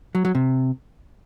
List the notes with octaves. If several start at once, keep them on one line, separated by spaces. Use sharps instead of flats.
F#3
F#3
C3